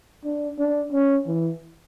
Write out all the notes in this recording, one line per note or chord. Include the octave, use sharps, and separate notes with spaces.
D4
D4
C#4
E3